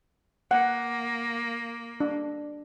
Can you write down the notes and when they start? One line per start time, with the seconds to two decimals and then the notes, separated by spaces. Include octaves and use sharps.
0.51 A#3 F#5
2.00 D4